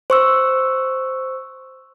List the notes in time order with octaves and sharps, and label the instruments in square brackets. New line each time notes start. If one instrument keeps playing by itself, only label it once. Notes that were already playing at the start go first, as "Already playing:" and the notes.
[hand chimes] C5 C#6 E6